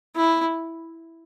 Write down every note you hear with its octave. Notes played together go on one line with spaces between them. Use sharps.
E4